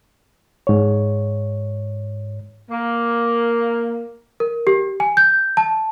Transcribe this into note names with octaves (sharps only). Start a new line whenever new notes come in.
G#2 C#5
A#3
A#4
G4
G#5
G6
A5